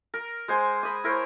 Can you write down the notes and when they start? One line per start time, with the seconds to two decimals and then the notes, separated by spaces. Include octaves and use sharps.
0.14 A#4
0.48 G#3 C5 G#5
0.83 B5 D#6
1.04 E4 A#4 C5 C#5